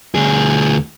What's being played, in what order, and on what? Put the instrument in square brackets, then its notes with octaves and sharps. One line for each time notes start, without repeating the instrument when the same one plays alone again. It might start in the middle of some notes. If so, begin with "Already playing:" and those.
[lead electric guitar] D2 G#4